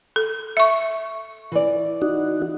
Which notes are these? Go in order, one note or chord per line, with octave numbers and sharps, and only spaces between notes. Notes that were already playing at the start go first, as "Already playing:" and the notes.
A4
E5 C#6
E3 D5
D#4 F#4